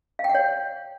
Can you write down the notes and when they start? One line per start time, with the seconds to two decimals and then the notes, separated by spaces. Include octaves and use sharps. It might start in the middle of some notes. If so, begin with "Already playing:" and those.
0.19 F5
0.24 G5
0.29 F#5
0.35 C#5